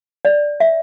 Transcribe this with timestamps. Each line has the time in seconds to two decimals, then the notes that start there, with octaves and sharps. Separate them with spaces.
0.25 D5
0.60 E5